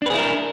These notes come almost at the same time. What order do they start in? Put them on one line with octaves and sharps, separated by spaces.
D4 B4 G#4 E4 A#4